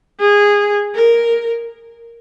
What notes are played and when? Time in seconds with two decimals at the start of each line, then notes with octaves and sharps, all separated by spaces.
0.20 G#4
0.95 A#4